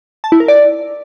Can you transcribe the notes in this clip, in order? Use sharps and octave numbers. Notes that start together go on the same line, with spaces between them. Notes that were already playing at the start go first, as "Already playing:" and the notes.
A5
E4
A#4
D5